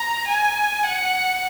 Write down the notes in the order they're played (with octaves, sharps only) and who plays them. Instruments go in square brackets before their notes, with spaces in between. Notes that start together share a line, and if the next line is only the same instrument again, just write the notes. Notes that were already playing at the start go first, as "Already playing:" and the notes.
Already playing: [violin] A#5
G#5
F#5